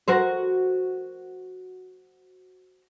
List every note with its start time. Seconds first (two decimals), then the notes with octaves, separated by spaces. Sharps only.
0.08 F#4 A#4 C5